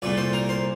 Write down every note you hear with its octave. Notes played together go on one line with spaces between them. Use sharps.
C2 A#2 A3 D5
C5
A#4
C5